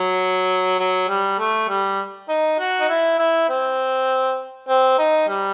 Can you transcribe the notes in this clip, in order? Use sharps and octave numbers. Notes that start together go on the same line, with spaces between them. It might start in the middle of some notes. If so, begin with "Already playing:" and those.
Already playing: F#3
F#3
G3
A3
G3
D#4
F#4
D#4
E4
E4
C4
C4
D#4
G3